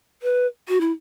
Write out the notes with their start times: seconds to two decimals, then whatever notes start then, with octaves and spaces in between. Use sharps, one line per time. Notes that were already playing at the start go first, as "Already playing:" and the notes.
0.22 B4
0.68 F#4
0.81 E4